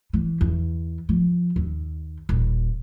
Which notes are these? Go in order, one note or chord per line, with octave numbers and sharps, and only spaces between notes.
E3
E2
F3
D#2
D#1